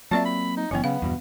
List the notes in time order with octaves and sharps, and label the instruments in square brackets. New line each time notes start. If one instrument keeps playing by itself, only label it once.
[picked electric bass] F#3 A#3 C4 [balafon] F4 D5 E5 [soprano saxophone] A5
[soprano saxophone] B5
D#4
[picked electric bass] F#1 E3 [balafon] F#3 B3 [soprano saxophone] C#4
[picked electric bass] C#3 [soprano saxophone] B3 [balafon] F5
[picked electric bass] E2 G2 B2